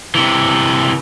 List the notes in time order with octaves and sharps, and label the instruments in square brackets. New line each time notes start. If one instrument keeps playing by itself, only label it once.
[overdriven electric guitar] C3 E3